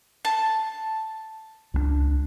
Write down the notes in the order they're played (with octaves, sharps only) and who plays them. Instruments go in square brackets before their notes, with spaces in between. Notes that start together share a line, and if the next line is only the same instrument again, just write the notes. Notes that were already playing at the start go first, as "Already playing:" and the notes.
[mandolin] A5
[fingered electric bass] C#2 G3 D4